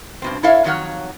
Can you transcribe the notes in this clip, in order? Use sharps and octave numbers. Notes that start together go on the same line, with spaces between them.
G2 B2 C4
E4 A4 C#5 E5 F5
F2 D#3 F#3 C#5 F5 F#5